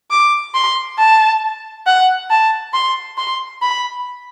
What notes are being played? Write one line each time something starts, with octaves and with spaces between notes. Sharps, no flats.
D6
C6
A5
F#5
A5
C6
C6
B5